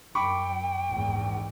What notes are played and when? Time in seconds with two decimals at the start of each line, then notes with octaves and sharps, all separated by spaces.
0.15 F#2 G5 B5 C#6 D6
0.86 A#1 E2 G#2